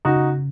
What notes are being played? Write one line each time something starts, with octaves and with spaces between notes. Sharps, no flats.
C#3 D#4 F#4